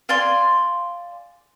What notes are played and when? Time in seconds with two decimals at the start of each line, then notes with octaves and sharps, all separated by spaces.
0.09 D5 F5 G#5 C6